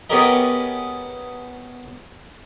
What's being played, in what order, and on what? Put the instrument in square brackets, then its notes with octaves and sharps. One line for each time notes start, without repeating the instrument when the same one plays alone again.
[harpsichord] B3 C#4 G4 G#4 A#4 D#5